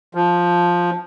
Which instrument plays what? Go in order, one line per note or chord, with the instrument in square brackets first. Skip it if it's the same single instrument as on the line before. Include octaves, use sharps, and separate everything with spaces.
[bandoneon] F3